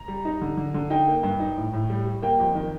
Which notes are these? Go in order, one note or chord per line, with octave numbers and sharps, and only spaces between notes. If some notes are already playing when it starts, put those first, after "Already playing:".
Already playing: A#5
G3
D#4
D3
D3
D3
D#4 G5
A#3
G2
D#4
A2
A2
G3
G3
A#3 G5
F2
D#3